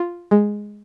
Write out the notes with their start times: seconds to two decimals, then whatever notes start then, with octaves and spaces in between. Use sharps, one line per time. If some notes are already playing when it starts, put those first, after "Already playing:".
Already playing: F4
0.31 G#3